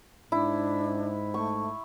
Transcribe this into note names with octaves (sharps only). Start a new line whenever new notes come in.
G#2 D4 E4
A3 C#6